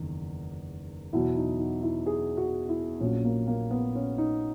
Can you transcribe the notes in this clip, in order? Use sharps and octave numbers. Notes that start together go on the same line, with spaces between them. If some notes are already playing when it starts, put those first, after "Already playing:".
Already playing: F#1 E2 D#3
E2 B2 F#3 E4
D#4
D#4
E4
G#4
F#4
E4
A#1 A#2 F#3 C#4
A#3
A#3
B3
C#4
D#4